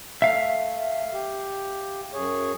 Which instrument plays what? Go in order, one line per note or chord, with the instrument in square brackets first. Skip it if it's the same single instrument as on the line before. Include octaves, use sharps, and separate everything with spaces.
[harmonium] A3 [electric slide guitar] E5 F5
[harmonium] G4
F#2 G#4 C#5